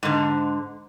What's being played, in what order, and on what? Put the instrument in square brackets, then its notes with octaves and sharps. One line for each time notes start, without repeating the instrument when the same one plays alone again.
[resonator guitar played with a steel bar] G#2 D3